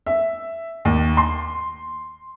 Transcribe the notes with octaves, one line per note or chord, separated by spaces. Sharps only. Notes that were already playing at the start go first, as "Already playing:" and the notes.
E5
D#2
C6